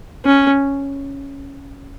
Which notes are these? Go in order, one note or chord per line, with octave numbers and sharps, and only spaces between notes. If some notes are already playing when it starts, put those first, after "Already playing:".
C#4